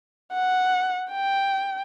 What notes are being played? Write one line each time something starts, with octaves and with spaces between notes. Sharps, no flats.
F#5
G5